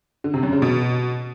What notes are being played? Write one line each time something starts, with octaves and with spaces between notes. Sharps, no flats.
D3
C3
F#2
C#3
B2